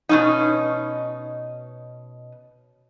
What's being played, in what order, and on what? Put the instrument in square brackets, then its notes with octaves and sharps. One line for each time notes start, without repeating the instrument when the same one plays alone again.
[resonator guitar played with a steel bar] B2 C#4 D#4